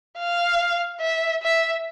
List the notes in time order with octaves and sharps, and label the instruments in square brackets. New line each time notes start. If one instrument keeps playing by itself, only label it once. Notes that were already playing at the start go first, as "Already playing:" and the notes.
[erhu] F5
E5
E5